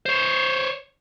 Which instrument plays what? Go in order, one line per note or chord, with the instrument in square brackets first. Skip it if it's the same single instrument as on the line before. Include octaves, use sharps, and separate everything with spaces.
[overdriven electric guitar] C5 C#5